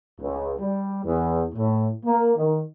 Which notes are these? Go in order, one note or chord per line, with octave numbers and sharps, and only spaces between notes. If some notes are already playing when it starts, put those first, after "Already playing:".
C#2
G3
E2
A2
A#3
D#3